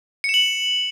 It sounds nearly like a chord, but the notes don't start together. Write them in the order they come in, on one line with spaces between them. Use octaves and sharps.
C#7 E7 F#7